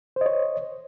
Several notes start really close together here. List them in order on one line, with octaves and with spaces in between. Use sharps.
C5 D#5 C#5